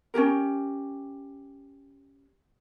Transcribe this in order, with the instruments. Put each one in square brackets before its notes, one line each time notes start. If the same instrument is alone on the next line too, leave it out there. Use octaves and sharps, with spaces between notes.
[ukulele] C#4 D#4 G4 A#4